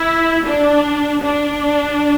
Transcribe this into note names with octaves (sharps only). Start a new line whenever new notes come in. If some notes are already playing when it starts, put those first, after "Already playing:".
Already playing: E4
D4
D4